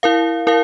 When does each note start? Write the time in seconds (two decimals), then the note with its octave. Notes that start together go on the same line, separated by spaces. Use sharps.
0.03 E4 A#4 F5
0.47 E4 A#4 F5